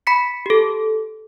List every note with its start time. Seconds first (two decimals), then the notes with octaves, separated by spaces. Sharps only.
0.07 B5 B6 C#7
0.46 G4 A4